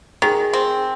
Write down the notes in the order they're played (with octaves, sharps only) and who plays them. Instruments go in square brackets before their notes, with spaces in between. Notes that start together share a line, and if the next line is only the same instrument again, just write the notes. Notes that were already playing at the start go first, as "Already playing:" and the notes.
[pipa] D#3 [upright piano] G#4
[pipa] C4